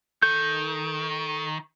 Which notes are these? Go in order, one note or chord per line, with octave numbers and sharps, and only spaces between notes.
D#3 A4 G6